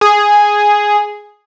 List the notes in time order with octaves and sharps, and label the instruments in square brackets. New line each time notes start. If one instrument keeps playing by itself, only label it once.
[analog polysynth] G#4